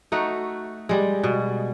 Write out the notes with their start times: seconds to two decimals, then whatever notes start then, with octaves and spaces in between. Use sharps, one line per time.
0.12 A3 D#4 F#4
0.89 G3 G#3
1.23 B2